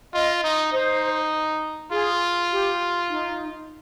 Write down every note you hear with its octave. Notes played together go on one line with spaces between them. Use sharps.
F4 D#5
D#4
D#4 C5
F4 G#4
G4
D#4